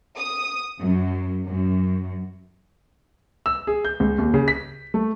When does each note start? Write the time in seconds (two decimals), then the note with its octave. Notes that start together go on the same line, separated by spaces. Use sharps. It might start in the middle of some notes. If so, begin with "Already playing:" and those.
0.19 D#6
0.80 F#2
1.45 F#2
3.46 E6
3.67 G#4
3.85 G6
4.00 C#2
4.18 D#2
4.34 C#3
4.48 B6
4.94 A3